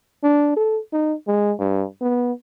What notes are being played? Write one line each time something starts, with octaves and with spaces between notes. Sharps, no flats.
D4
A4
D#4
G#3
G2
B3